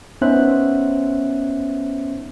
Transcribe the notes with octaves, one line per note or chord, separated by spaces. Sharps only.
B3 C#4 D#4 C5 E5 F#6